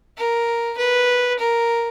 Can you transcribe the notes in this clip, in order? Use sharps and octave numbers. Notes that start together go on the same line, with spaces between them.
A#4
B4
A#4